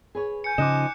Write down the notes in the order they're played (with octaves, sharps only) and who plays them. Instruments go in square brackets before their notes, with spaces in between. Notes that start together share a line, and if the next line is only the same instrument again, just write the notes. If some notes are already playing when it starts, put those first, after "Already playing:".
[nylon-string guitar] G#4 B4 C#5
[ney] G#5 [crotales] G6 C#7
[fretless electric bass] C#3 [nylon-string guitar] F3 D#4 D#5 [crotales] D6 F#6 E7